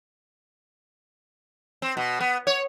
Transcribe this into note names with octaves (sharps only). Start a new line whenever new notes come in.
C4
B2
B3
C#5